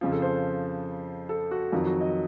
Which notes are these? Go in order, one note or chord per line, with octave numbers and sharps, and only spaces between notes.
F2 C#3 F3
A4
C5
A4
F#4
F2 D#3 F#3 F4
F#4
D#5